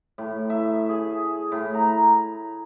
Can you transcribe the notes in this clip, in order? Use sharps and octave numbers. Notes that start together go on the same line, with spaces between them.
A2
E5
G#4
A2
A#5